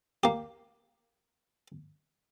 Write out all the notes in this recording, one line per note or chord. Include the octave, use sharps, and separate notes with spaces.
A#3 G4